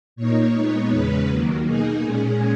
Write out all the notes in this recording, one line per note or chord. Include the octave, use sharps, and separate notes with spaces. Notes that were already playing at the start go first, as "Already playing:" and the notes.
A#2 A#3 D#4 C#5
A#2 G#3 B3 D#4
E2 C#3 G#3 C#4 B4
D#2 D#3 F#3 A#3
B2 A#3 D#4 G#4
A#2 G#3 C#4